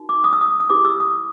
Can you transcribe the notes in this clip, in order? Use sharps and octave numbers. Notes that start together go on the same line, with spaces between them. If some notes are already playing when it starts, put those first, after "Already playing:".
Already playing: D#4 F#4 A#4
D6
D#6
E6
D#6
D#6
E4 G4 B4 D6
E6
D#6